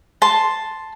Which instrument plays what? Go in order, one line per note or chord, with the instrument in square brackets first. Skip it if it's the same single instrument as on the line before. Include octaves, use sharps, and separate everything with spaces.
[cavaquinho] A5 C6